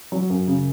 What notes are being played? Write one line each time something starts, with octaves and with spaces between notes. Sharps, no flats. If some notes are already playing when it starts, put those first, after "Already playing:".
F#3
F#2
C#3